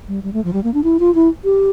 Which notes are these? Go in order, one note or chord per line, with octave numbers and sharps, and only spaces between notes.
G3
G3
A3
F3
G3
A#3
D4
E4
F4
E4
G4